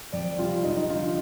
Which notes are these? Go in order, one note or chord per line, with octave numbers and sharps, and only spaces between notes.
F2 D5
C3 G3 F4
F2 D#4
D#4
D3 G3 F4
D#4